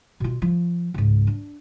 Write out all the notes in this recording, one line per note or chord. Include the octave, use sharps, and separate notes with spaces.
B2 F4
F3
C#2 G#2
D4